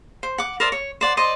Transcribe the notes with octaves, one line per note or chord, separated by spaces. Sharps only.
C5
F#5 D6
A#4 C5 D5 E5
C#5
C5 D5 F#5
C5 D5 D#5 C6